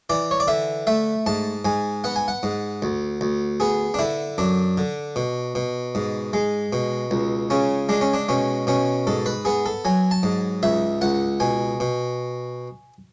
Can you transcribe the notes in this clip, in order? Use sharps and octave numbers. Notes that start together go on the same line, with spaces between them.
E3 D5
C#5
D5
D3 E5
A3 E5
G#2 A5
G#2 G#5
B3 F#5
G#5
F#5
G#2
D2
D2
B3 G#4
D4
D3 E4
F#2 D4
D3
B2
B2
G#2
G#3
B2
C#2
C#3 C#4
G#3 D4
C#4
D4
B2 C#4
B2 C#4
G#2 A4
B4
B3 G#4
A4
F#3 G#5
A5
G#2
C#2 E5
C#2 F#5
B2 G#5
B2